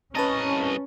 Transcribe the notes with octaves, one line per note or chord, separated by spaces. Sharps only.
C2 C#4 B4 D#5 A5 A#5